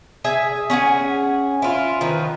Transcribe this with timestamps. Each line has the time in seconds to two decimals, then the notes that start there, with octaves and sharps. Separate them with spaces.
0.24 G#4 E5 G#5
0.70 C#4 G#4 F#5 G#5
1.62 E4 F4
2.01 D#3 F3 B4